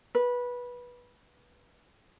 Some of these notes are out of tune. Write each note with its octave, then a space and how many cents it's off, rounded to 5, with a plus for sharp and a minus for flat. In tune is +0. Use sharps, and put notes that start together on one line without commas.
B4 -15